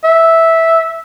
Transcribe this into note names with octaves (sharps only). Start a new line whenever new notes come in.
E5